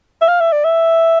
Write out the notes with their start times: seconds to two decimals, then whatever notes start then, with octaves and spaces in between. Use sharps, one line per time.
0.21 E5
0.28 F5
0.40 E5
0.53 D5
0.64 E5